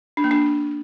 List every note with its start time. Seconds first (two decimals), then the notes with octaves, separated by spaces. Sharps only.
0.17 D4
0.24 A#3
0.31 D4